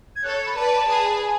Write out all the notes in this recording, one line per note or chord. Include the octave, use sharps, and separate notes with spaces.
G#6
A4 C#5 F#6
B5
B4 D5 A5
G#4 B4
G#5